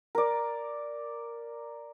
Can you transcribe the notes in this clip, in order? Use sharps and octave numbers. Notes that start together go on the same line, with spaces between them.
A#4 D5